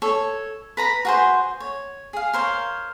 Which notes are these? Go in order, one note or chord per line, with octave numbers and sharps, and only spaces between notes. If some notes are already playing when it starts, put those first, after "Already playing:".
A4 C#5
B4 A#5 B5
F#4 G#4 C5
C#5
G#4 F5
A#4 C5 C#5 F5